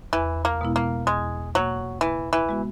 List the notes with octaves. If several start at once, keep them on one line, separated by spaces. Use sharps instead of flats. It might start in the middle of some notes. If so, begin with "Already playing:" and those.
E2 E3
A#3
B2 G#3 B3 E4
A#3
E2 G#3
B2 F#3 A#3
C#3 E3
E3
G#3 B3 F#4